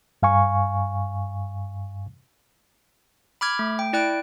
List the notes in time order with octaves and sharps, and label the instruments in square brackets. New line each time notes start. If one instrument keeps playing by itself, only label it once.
[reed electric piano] G2 F5 G#5 C#6
[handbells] B5 D6 F6 G#6
A3
G5
E4 D5 G5 F#6 D7